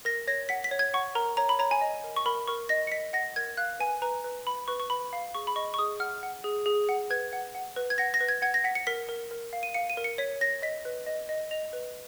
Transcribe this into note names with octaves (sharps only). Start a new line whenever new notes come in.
A#4 A#6
C#5 A#6
F#5 B6
B6
C#5
G#6
F#5 C#6
A#4 A#5
C#5 A#5
B5
C#5 A#5
G#5
D#5
A#4
C#6
A#4 B5
A#4 C#6
D#5 A#6
C#7
D#5 B6
F#5 A#6
A#4 G#6
F5 F#6
B4 G#5
B4 A#5
B4
B4 B5
B4 C#6
C#6
B4 B5
F5
G#4 C#6
B5
D#5 C#6
C#6
G#4 D#6
F#5 F6
F#5
G#4
G#4
F#5
B4 G#6
F#5
F#5
B4
G#6
F#5 A#6
A#6
B4
G#6
F#5 G#6
A#6
F#5 B6
C#7
A#4 B6
A#4
A#4
F5
D#7
F5 C#7
D#7
A#4
C#7
C#5 B6
C#5 A#6
D#5 B6
B4
D#5
D#5
D#5 F7
B4